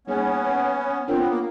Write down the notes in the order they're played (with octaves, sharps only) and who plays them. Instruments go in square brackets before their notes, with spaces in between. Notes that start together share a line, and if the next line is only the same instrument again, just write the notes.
[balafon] G3 A#3 D#4 G#4 C#5 [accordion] B3 C#4
[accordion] C4 [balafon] D4 F4 A#4 C#5
[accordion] B3
A#3